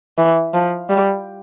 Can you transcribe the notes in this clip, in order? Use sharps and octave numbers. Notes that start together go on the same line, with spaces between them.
E3
F3
G3